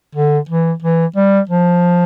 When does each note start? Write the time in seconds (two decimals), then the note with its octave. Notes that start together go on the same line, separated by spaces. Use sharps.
0.15 D3
0.49 E3
0.82 E3
1.16 G3
1.49 F3